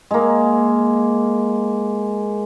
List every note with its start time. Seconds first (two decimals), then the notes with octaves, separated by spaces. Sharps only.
0.11 G#3 A#3